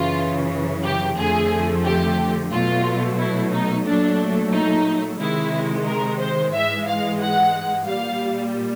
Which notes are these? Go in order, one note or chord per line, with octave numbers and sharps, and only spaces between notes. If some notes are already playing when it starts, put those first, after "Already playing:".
Already playing: F#2 C#3 E3 F4
G4
F2 D3 F3 A3 G#4
G4
B2 F#3 A3 F4
E4
D#4
A#2 F#3 A3 D4
D#4
C3 D#3 G#3 E4
A#4
C5
G#2 E3 G#3 E5
F5
F#5
A#2 G3 F5